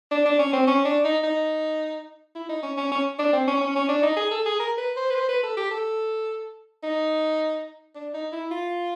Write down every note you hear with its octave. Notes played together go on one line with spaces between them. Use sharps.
D4
D4
C#4
C4
C#4
D4
D#4
D#4
E4
D#4
C#4
C#4
C#4
D4
C4
C#4
C#4
C#4
D4
D#4
G#4
A4
G#4
A#4
B4
C5
B4
C5
B4
A4
G4
A4
D#4
D4
D#4
E4
F4